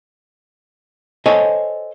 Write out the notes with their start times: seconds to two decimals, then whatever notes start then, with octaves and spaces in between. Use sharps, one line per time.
1.26 A4 C5 C#5 D#5 G#5